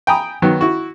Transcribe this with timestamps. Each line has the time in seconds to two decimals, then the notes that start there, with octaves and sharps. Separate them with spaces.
0.07 G5 G#5 A#5 B5 D#6
0.42 D#3 F#3 B3
0.61 E4 F#4